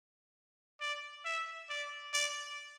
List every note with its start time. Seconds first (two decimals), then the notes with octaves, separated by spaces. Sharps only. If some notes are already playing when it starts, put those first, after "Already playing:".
0.81 D5
1.25 E5
1.70 D5
2.14 D5